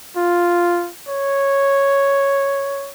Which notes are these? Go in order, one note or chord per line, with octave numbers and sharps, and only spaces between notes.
F4
C#5